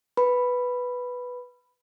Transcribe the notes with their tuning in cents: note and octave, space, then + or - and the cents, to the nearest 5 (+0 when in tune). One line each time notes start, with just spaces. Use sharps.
B4 +0 B5 +0